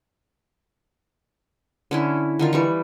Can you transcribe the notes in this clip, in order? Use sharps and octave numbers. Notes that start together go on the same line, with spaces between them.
D3 C#4 E4
D3 D#3 F4
E3 G3 C#6